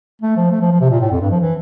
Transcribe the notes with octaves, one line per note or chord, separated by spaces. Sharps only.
A3
F3
A3
F3
F3
C3
A#2
A2
F2
G2
F3
E3